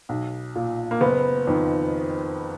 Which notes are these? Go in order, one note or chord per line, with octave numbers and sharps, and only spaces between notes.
B1
A#2
A#3
F#1 B3
F2 D#3